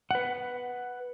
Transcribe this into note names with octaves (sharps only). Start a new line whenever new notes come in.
B4 F#5